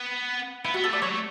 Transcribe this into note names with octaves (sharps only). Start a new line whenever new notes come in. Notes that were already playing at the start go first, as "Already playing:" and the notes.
Already playing: B3
B3 E4
F#4
B3
A4
A3 D5
F#3 C#5
A3